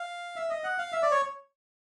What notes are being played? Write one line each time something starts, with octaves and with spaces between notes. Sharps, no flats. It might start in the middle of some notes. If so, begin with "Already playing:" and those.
Already playing: F5
E5
D#5
F#5
F5
E5
D5
C#5